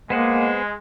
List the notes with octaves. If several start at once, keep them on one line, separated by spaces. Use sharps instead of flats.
G#3 A#3 B3 C5 F#5